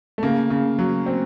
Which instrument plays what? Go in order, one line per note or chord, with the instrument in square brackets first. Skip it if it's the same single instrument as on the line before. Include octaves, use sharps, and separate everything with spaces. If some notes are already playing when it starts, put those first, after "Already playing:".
[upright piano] A3
[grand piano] C#3 [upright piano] A#3
[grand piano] C#3
F#3
[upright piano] C4